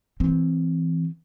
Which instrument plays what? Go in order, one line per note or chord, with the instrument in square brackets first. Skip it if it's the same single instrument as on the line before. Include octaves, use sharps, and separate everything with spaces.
[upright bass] E3 C4